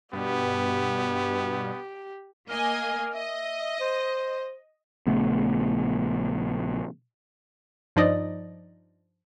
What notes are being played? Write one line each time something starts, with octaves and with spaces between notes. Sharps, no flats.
G2 B2 B3 G4
A#3 D#5 G#5 F6
D#5 E5
C5
A#1 C#3 A3 B3
G2 F3 D#4 D5 D#5 D#6